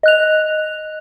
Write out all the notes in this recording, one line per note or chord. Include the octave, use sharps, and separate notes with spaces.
D#5 F#6 F7